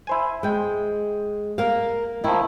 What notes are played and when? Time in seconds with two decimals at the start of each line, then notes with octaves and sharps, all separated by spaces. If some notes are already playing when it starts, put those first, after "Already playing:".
0.07 E4 C5 G#5
0.43 G#3 G5
1.58 A#3 A#4 F5
2.24 D#3 F3 D#4 E4